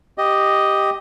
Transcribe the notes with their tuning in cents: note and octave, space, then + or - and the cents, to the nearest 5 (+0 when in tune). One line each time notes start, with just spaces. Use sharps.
G4 +0 D#5 +0